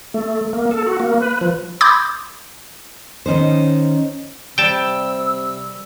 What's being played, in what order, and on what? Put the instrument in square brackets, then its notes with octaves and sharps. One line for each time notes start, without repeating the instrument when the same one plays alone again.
[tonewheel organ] A3
A#3
A4
F#4
A#3
B4
F3
[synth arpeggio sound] B5 C6 D6 D#6 G6 G#6
[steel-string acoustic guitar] D#3 C#4 D#4 C5
[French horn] C3 [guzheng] G3 [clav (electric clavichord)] G5 A5 [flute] E6